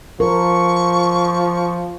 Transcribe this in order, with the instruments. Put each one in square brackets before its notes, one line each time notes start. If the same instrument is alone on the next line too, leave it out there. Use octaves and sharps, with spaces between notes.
[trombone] F3 [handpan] A#4 [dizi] C#6